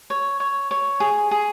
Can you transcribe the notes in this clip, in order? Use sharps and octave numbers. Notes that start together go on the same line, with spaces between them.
C#5
C#5
C#5
G#4
G#4